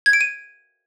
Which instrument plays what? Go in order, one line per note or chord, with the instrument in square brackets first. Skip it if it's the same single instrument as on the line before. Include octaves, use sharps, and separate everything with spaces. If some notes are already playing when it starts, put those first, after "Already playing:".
[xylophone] G#6
D7
D#7